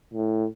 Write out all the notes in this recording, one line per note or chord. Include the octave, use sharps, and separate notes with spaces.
A2